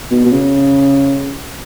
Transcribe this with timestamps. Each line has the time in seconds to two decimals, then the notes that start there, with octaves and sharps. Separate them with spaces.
0.11 B2
0.26 B2
0.32 C#3